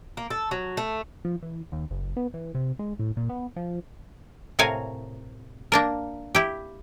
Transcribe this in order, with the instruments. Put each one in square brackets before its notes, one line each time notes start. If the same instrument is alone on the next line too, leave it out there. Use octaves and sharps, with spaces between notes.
[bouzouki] A#3
A4
F#3
A3
[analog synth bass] F3
E3
D#2
F#1
B3
E3
C3
G#3
A2
A#2
B3
F3
[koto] A2 C3 A#4 C#5 F5 G#5
A#3 D4 A#4
E4 G4